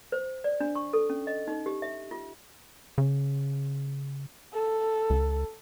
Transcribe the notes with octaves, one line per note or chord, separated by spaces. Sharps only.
C5
D5
D4
C#6
A4
C#4
D#5
D#4
G4
E5
F4
C#3
A4
C#2